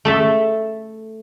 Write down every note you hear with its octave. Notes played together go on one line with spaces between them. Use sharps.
A3 A4 E5